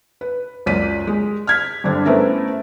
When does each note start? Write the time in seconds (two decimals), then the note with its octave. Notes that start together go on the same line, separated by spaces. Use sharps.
0.21 B4
0.66 C#2 F#2 D5 B6 D#7
1.07 G#3
1.47 F6 G#6 B6
1.84 G2 D3 C4 D4
2.05 A3 B3 C#4 E4 A#4 C5